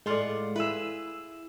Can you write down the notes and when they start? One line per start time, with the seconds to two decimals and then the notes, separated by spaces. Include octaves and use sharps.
0.06 A2 G#3 F4 D5 F#5
0.56 E4 G#4 B4 E6